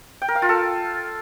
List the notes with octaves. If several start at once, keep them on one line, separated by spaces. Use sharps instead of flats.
G5
A#4
F5
F4
A4